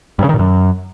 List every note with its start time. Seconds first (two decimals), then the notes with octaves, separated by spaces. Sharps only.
0.19 G2
0.24 C#3
0.29 D#3
0.34 A#2
0.39 F#2